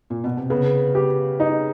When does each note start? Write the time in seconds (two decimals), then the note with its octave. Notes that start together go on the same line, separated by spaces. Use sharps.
0.10 A#2
0.24 B2
0.37 C3
0.50 C#3 B3
0.95 G4
1.40 D#4